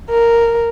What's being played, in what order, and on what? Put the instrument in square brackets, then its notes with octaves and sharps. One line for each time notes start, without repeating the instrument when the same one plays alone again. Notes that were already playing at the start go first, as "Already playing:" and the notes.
[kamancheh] A#4